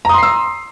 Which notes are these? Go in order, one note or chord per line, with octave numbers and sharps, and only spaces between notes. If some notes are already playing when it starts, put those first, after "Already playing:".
A#5 C6 D#6 E6 C7